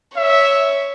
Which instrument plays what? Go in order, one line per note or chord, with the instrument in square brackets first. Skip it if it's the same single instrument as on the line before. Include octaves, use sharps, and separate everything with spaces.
[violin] C#5 [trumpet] E5